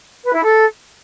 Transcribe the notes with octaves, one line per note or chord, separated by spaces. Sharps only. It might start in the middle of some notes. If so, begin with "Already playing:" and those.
B4
E4
A4